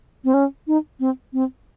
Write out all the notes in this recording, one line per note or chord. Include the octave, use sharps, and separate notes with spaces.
C4
C#4
D#4
C4
C4